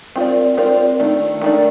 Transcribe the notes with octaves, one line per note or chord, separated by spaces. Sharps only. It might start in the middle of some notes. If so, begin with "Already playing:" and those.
C4 F4 A#4 D5
C4 F4 A#4 D5
D#3 A3 D4
D#3 A3 D4